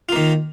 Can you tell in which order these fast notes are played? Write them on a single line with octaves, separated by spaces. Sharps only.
F4 A#3 D#3